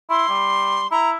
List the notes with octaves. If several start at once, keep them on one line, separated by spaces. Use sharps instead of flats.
E4 C6
G3
E4 A#5